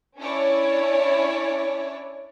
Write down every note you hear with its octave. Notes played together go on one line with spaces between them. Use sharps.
C#4 D4 E4 C#5 D5